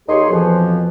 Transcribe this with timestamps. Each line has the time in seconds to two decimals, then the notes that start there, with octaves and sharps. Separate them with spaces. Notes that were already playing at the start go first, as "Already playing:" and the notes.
0.08 D#2 D#4 G4 G#4 C#5 C6
0.30 F2 B2 E3 F3